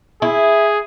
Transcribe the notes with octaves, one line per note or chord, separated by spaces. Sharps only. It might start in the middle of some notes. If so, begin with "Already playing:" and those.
E4 G#4